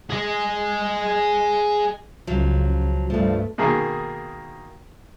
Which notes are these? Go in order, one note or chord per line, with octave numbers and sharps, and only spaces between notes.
G#4 D#5
C#2 F3 F#3
G2 F3 A3
B2 D#3 A#3 G#4